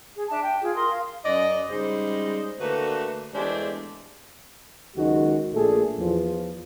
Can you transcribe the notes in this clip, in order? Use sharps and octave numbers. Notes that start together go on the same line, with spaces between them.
G#4
D4 E5 A5
G5
F4 G#4
A#4 C6 D#6
F5
F#2 D5 D#5
C#3 G3 G#3 D#4 C5
D3 A3 A#3 F#4 B4
E2 G#3 A3 D4 G4 C5
C#2 D#3 F#3 G#3 D#4 F#4
A#1 A#2 A3 D4 G#4 A4
E2 F3